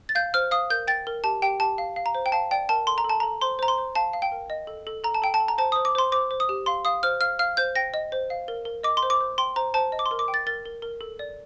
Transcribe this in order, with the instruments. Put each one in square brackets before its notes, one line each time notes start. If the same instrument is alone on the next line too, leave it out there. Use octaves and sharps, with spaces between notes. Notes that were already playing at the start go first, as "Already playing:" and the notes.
[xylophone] A6
F5 G6
C5 F6
F5 D#6
A#4 G6
G5 A6
A#4
G4 A5
G4 G5
G4 A5
F5
F5
A#5
C5
G5
F5 A5
D5 G5
A#4 A5
A4 C6
A#5
A4 A5
A4 A#5
C5 C6
C5 A#5
C6
C5
F5 A5
F5
G5
A#4
D#5
A4
A4
A4 A#5
A5
A4 G5
A5
A4
A#5
C5 A5
C5 D#6
D6
C5 C6
C5 D6
C5
D#6
G4
F5 C6
F5 D#6
C5 F6
F5 F6
F5 F6
C5 G6
G5 A#6
D#5
C5
F5
A#4
A#4
D#5 D6
C6
C5
D6
C5
G5 C6
C5 A#5
C5 A5
D#5
D6
C6
A#4
D6
G5
A6
A#4 A6
A#4
A#4
A4
D5